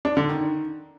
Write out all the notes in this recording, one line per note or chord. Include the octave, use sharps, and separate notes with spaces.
D4
D3
D#3